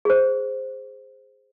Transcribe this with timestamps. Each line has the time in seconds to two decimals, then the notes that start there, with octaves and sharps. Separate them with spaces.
0.05 G#4 C5